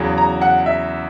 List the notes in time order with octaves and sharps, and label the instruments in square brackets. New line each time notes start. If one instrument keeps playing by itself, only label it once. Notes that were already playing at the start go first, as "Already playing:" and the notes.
Already playing: [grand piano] E2 C#3 F#3
[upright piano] A#5
F#5
E5